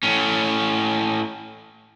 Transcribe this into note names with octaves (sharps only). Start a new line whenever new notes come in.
A2 C#4